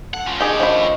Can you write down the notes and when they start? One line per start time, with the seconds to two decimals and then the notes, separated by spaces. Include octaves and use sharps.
0.14 A4 F#5
0.27 C#4 F4
0.40 D#3 D4 D#4 G4 G#4 C#5 G5
0.60 D#3 F3 A3 C#4 B5